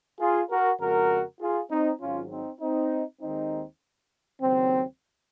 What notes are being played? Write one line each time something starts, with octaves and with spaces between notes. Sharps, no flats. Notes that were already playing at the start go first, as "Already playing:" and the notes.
F4 G#4
F#4 A#4
F2 C#3 G#3 F#4 A#4
F4 G#4
C4 D#4
G#1 G#2 F#3 C#4 F4
C4 D#4
C4 D#4
D#2 D#3 G#3 C4 D#4
D#2 C#3 F#3 C4